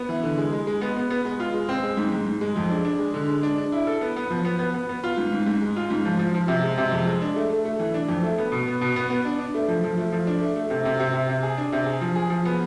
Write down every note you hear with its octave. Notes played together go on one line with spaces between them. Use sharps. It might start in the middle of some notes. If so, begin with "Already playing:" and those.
Already playing: B3
E3
D3
G#3
G#3
G#3
B3
B3
B3
G#3
F4
G#3
C4
G#3
G#2
G#2
G#2
G#3
F2
D4
D4
G#3
D3
G#3
D4
D4
E4
A4
B3
B3
F3
B3
B3
B3
B3
F4
G#2
G#2
G#2
G#3
F4
G#2
F3
F3
F3
C3
G#3
C3
F2
G#3
D4
A3
A3
A3
E3
D4
F2
A3
B3
B2
B3
B2
B3
B3
D4
D4
A3
F3
F3
A3
F3
D4
A3
A3
C3
C3
C3
C3
C3
G#4
D4
C3
G#4
F3
G#4
F3
B3